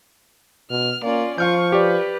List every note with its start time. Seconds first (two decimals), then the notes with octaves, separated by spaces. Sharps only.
0.71 B2 F6
1.02 A#3 C#4 F4 D5
1.38 F3 F4 F5 C#6 F6 G6
1.72 G4 B4 D5